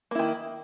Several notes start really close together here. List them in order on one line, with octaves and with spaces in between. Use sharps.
A#3 E4 D#3